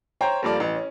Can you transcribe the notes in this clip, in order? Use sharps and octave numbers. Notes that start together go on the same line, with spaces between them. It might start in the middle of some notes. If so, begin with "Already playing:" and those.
C5 C#5 G5 A#5 C6
G2 F3 A#3 A4 D5
A1
C#4